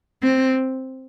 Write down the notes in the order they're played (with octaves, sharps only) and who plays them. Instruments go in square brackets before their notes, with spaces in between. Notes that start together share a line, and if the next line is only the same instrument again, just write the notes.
[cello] C4